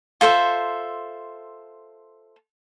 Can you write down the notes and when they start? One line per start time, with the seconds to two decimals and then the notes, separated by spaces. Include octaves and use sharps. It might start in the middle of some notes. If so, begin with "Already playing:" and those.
0.21 F4 A4 C5 E5